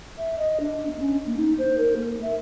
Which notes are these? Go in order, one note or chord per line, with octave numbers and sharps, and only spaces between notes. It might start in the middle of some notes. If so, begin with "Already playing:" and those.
E5
D#5
D4
B3
C#4
A#3
D#4
C5
A#4
A#3
E5